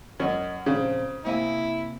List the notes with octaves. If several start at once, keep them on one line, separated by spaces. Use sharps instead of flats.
F#2 C#5 D#5
A#2 C#3 F3 C4
C3 A#3 E4 G#5